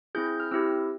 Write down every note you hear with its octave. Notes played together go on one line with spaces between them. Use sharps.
C4 E4 G#4 G6
G6
F6
C4 E4 G4 E6